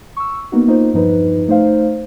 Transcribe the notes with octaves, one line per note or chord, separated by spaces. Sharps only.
C#6 E6
A#3 B3 D#4 F#4
A#3 D#4 F4 C5
E2 G2 F3 D#4 B4
A3 D#4 C5 F5